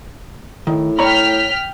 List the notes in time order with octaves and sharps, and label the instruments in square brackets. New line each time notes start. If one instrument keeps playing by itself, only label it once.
[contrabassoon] A2 [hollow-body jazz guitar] D#3
[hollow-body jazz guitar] C#5 A#5 B5 [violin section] G5 F6 B6